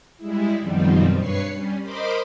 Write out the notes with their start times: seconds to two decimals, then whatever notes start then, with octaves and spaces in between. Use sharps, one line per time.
0.18 G3 G#3 E4
0.60 F#2 B2 D#3 F3 G3 C4
1.16 G2 B4 C#5 C#6 C7
1.52 G3 C#4
1.82 A#4 C5 D#5 B5 C6 D6